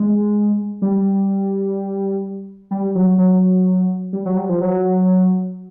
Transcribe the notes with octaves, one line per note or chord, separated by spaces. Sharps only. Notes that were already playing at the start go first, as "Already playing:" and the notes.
Already playing: G#3
G3
G3
F#3
F#3
G3
F#3
G3
F3
F#3